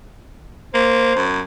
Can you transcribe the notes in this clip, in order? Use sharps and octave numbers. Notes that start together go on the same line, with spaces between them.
A#3 C5
F#2